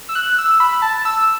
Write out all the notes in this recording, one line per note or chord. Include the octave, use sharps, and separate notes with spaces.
E6
F#6
E6
B5
A5
E6